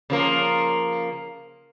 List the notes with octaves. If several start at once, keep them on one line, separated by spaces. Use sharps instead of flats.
C#3 F3 A#3